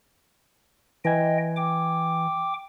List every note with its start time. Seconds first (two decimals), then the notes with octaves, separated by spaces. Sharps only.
1.05 E3 D#5 G5 G#5 G#6
1.57 G5 D6